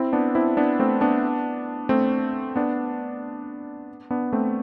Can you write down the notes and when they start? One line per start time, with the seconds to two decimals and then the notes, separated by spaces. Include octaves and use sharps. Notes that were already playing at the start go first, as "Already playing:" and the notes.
Already playing: C4 E4
0.13 B3 D4
0.35 C4 E4
0.57 B3 D4
0.79 A3 C4
1.01 B3 D4
1.89 A3 C4
2.56 B3 D4
4.11 B3 D4
4.33 A3 C4